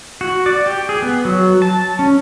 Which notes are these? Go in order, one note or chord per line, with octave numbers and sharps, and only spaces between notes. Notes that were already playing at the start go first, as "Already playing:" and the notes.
F#4
D5
G4
G#4
B3
F#3
A5
C#4